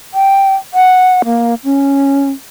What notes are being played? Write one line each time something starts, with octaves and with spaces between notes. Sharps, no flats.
G5
F#5
A#3
C#4